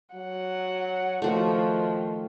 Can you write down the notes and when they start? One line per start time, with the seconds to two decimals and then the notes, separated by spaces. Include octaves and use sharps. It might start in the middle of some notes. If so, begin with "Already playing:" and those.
0.15 F#3 F#5
1.22 D#3 F3 A3 F#4